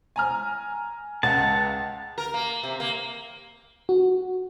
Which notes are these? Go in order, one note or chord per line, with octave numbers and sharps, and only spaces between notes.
G#5 A#5 F6
C#2 F#5 A5
A#4
A#3
C3
A#3
F#4